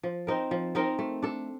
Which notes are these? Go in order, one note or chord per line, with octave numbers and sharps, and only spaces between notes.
F3
C4 D#4 A#4
F3
C4 D#4 A#4
A3
D4 A4